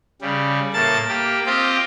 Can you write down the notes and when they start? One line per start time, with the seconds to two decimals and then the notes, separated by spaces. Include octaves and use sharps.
0.22 C#3 G3
0.74 A2 A#3 A5 A6
1.09 A#3 G4
1.46 C4 F4 G4 D#5 F5 G5